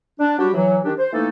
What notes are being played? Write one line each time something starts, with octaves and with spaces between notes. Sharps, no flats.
D4
F#3 G3 D4 F#4 G4
E3 F#3
D#3 D4 G4
C5
E3 A3 A#3 D#4 A4